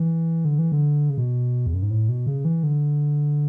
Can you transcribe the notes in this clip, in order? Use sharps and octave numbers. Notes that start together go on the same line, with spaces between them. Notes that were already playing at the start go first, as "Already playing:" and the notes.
Already playing: E3
D3
E3
D3
C#3
B2
E2
F#2
G#2
A2
B2
C#3
E3
D3